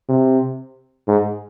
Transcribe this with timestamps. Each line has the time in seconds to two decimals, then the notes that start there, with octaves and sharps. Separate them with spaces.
0.09 C3
1.08 G#2